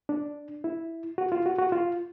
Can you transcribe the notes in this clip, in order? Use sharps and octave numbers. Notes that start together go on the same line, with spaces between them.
D4
E4
F#4
F4
F#4
F#4
F4